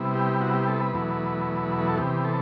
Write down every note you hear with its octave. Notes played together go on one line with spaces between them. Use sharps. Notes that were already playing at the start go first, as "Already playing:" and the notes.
Already playing: C3 G3 B3 E4
G4
F#4
G4
A4
B4
E2 B2 F#3 A3 E4
B4
A4
C3 E3 B3 G4
A4